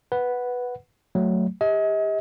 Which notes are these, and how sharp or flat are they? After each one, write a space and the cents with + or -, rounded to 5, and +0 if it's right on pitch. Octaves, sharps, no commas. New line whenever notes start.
B4 +0 F#5 +0
F#3 +0 A3 +0
G4 +30 D#5 +40